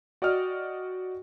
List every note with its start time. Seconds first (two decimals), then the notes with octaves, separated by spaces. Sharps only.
0.22 F#4 D5 D#5 G5 D#6 F6